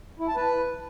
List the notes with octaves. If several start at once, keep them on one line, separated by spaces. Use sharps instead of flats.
E4
A5
B4